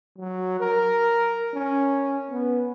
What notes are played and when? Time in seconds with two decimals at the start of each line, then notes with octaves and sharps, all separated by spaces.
0.18 F#3
0.60 A#4
1.54 C#4
2.30 B3